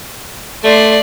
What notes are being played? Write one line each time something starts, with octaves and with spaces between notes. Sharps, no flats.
A3 D5 C6